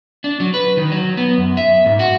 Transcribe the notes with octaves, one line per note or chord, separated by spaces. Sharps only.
D4
F#3
B4
D#3
F#3
B3
F#2
E5
G#2
F#4